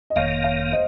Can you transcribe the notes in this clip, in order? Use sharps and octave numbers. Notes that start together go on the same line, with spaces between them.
D#5
F#1 F2 D#3 A#3 C#5 F5
C#5 F5
C5 D#5